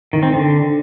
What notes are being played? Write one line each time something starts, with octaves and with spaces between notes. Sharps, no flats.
D#3
C4
D3